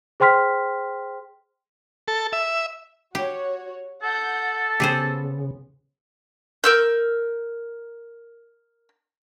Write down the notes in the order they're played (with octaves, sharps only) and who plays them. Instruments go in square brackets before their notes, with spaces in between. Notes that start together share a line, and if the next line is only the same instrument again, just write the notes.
[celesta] G#4 C5 G5 C6 F6 B6
[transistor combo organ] A4
E5
[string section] F#4 C#5 [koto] G4
[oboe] A4 [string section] F#5 G6
[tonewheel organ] C#3 [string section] B3 [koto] G4 G#4 C5
[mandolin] A#4 E6 G6